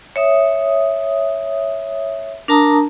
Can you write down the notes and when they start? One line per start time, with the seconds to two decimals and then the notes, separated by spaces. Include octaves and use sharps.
0.16 C#5 E5 D#6
2.48 D4 A#4 A5 A#5 D#6